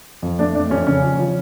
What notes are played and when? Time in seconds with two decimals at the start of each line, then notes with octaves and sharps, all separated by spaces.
0.22 F2
0.39 A3 D4
0.55 F2 D4
0.71 F2 C#4
0.87 C#3 C#4
1.03 F3
1.19 F3